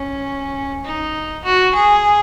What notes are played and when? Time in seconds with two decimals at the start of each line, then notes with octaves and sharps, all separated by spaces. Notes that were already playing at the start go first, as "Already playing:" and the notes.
Already playing: C#4
0.84 D#4
1.44 F#4
1.75 G#4